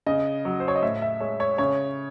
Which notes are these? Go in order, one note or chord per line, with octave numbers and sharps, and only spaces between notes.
C#3 D#5
F#3
C5
C#5
D#5
A2 E5
E5
G#3 C#5
C#5
C#3 C#5